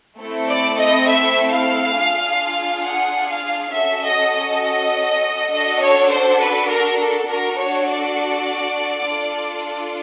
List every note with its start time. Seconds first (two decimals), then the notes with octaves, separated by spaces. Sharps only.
0.18 A3 C4 E4 A4
0.48 D5
0.77 D#5
1.07 E5
1.52 F5
1.96 D4 F4 G#4
2.85 F#5
3.29 F5
3.73 C#4 F#4 A4 E5
4.03 D#5
4.33 D#5
5.51 D4 F#4 A4 D#5
5.81 C#5
6.10 C5
6.39 B4
6.69 A#4
6.99 A4
7.28 D4 F#4 A4 A#4
7.58 C#5
7.88 D5
9.06 D4 F4 A4